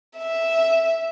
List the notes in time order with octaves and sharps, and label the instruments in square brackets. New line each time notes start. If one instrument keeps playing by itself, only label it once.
[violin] E5